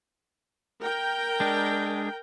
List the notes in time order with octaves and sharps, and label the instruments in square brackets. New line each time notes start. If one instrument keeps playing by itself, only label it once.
[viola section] A#4 G5
[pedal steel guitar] G#3 D4